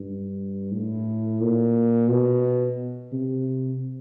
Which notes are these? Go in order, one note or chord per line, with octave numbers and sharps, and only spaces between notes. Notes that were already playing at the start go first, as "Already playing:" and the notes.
Already playing: G2
A2
A#2
B2
C3